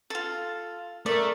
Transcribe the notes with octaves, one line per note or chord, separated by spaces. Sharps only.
F4 A4
A3 A#4 D5